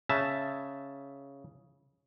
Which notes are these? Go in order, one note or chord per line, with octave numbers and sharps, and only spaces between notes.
C#3 E5 A5